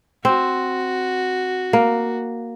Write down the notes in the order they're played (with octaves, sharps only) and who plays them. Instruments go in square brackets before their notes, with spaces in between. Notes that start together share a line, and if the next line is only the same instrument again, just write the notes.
[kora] C4 [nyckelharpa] F#4
[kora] A#3